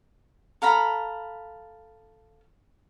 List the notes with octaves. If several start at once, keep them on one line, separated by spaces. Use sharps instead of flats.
A4 F5 A#5 B5